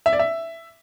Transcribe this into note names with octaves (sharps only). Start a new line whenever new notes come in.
E5
D5
E5